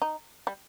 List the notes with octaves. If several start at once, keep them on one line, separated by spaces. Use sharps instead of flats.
D#4
G3